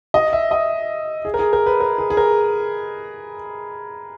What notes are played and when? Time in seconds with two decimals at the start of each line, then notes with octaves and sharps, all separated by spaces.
0.14 D#5
0.33 E5
0.51 D#5
1.25 G#4
1.34 A#4
1.39 G#4
1.53 A#4
1.66 B4
1.80 A#4
1.98 G#4
2.10 G#4
2.17 A#4